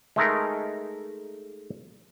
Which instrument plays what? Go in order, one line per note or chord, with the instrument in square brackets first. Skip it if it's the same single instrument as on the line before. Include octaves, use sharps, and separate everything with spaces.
[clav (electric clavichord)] G#3 A3 D#4 A#4